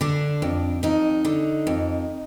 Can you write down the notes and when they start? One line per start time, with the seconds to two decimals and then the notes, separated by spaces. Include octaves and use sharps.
0.01 D3 D4
0.42 F2
0.83 F2 D#4
1.25 D3
1.67 F2